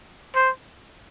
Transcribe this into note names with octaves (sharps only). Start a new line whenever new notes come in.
C5